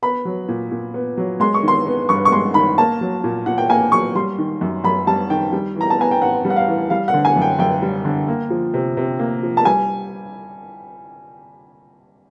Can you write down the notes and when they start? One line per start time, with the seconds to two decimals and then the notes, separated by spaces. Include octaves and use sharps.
0.02 B3 B5
0.25 F#3
0.48 A#2
0.71 A#2
0.94 B3
1.17 F#3
1.40 G#3 C6
1.54 C#6
1.63 D#3 C6
1.86 B3
2.09 G2 C#6
2.25 C#6
2.32 G#3 C6
2.54 D#3 B5
2.78 A#3 A5
3.01 F#3
3.24 A#2
3.46 A#2 F#5
3.58 G5
3.70 A#3 G#5
3.92 F#3 C#6
4.15 G3 C6
4.38 D#3
4.61 F#2
4.84 F#2 B5
5.07 G3 A5
5.30 D#3 G5
5.53 G3
5.76 E3 A#5
5.90 A5
5.99 B3 G#5
6.11 G5
6.22 A2 F#5
6.45 G3
6.50 F#5
6.56 F5
6.68 E3
6.90 G3 F5
7.08 F#5
7.14 D3
7.25 G#5
7.36 F#2
7.42 G5
7.59 F#2 G5
7.82 G3
8.05 D3
8.28 A#3
8.50 F3
8.74 C3
8.97 C3
9.19 A#3
9.43 F3
9.57 A5
9.65 G3 G#5